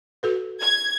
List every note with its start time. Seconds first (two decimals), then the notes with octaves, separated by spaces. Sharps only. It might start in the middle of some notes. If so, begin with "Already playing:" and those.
0.23 F#4 A4 B4
0.61 G#6